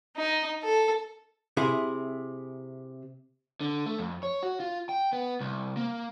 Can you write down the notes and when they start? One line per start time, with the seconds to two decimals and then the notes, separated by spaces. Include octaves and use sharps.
0.17 D#4
0.63 A4
1.57 C3 E4 G#4
3.61 D3
3.86 A3
3.98 F2
4.23 C#5
4.43 F#4
4.60 F4
4.89 G5
5.13 B3
5.40 C2
5.77 A#3